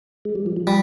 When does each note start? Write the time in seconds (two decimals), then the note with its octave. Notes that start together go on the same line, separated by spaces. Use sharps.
0.25 G#3
0.35 G3
0.46 F3
0.56 F3
0.67 G3